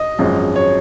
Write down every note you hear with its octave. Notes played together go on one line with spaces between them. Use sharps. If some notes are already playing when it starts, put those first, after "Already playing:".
Already playing: D#5
G#1 F#2 F3 G#3
C#5